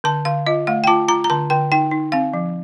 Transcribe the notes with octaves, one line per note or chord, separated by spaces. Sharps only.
D3 A5
D3 F5
F4 D#5
A3 F5
G5
F4 A5
F4 A#5
A#5
D3 A5
D3 G5
D#4 G5
D#4
C4 F5
F3